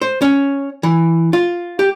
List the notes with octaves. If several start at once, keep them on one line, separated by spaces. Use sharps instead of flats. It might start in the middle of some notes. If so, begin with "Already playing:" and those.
C5
C#4
E3
F4
G4